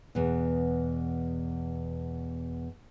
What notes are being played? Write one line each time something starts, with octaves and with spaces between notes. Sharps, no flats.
E2 B2